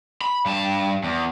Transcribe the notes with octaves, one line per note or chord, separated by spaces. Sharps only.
B5
G2 A5
E2